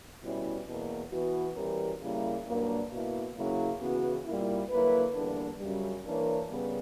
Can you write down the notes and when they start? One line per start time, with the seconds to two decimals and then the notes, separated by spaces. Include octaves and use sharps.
0.22 B2 G3 C#4 E4
0.66 E2 B2 A#3
1.10 E3 B3 F#4
1.55 E3 G3 C#4 G4 A#4
2.00 C#3 G3 A#3 E4
2.45 G2 F#3 A#3 D4
2.90 B2 A#3 E4
3.35 C#3 F#3 A#3 E4
3.80 C#3 E3 B3 F#4
4.24 A#2 G3 A#3 E4
4.69 D3 F#3 A#3 E4 B4
5.14 E2 D3 G3 A#3 D4
5.59 F#2 C#3 G3
6.04 E3 A#3 D4 A#4 C#5
6.48 C#3 G3 B3